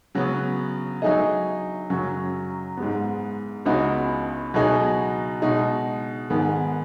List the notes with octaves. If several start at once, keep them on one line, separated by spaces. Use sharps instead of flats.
C#3 F#3 B3
F#3 D#4 G#4 D#5
F#2 C#3 F#3 C#4
G#2 G#3 B3
C#2 C#3 B3 D#4 F#4
B2 F#3 B3 D#4 G#4
B2 G#3 D#4
G#2 D#3 B3 G#4